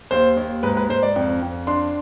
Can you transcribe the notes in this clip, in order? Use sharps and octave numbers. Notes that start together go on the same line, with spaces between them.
D#2 C5
D#2
G#2 B4
B4
G#2 C5
D5
F2
F2
D4 C6